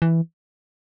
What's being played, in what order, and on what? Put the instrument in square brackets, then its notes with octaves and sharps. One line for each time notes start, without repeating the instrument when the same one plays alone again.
[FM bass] E3